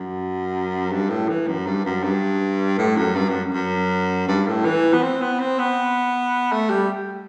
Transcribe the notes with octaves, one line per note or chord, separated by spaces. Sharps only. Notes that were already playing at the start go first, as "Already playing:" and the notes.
Already playing: F#2
G2
A2
E3
F#2
G2
F#2
G2
A2
F#2
G2
F#2
F#2
G2
A2
E3
B3
C4
B3
C4
B3
A3
G3